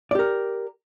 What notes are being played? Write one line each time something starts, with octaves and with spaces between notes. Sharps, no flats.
G4 A#4 D5